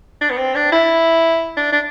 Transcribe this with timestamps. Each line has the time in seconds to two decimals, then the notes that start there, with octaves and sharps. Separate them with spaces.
0.21 D4
0.30 B3
0.38 C4
0.55 D4
0.72 E4
1.57 D4
1.72 D4